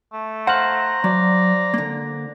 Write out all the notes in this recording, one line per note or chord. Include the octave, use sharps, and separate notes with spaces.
A3
C5 F5 F#5 A#5 F#6
F#3 D5
D3 A#3